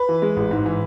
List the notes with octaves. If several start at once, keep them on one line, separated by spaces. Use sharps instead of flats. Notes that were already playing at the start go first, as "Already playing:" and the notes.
Already playing: B4
E3
G#3
A1
G#2
E3